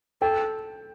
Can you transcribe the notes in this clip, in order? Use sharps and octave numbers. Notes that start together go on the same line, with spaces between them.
A4 G5